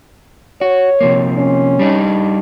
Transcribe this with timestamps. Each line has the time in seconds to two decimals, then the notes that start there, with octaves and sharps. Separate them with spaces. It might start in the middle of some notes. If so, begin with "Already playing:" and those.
0.61 F#4 C#5
1.01 C3 F3 A#3
1.38 C#4
1.79 G3 D4 D#4